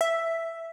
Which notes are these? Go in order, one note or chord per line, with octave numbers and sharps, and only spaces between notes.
E5